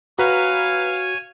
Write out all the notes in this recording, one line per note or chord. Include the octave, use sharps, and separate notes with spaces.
F#4 B4 C#5 F5 G#5 A#5